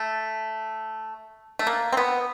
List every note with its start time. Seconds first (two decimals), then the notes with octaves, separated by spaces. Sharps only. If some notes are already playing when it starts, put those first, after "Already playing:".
Already playing: A3
1.59 A3
1.67 A#3
1.92 C4
1.97 B3